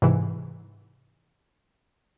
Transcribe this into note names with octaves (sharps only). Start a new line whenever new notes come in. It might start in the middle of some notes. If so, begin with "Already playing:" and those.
G#2 C3 E3